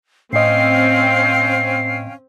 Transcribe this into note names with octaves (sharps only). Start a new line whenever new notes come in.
A2 C4 C#4 D#5 F5 G5 C7